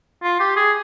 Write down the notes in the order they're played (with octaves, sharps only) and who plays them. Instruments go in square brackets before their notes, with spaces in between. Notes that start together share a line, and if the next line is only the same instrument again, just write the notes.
[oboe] F4
G4
G#4